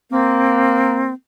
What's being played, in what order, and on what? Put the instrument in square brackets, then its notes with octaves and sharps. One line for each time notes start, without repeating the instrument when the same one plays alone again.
[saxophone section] A#3 [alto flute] C4